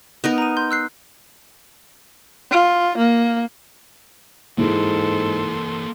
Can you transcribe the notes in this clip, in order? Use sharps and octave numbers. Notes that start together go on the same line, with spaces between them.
B3 D#4 A#4
A#5 D#7
C6 G6
E6 F#6 C7
F4
A#3
G#2 E3 G#3 A#3 E4 A4 C6